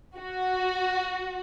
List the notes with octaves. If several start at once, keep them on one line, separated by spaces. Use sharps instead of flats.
F#4